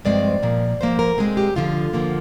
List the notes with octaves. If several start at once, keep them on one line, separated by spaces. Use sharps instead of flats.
G2 F3 G#3 C4 D5
A#2 F3 A#3
G#2 F3 A#3 C5
A#4
A#2 G#3 C4 G#4
G4
D2 D3 F3 F4
D3 F3 A#3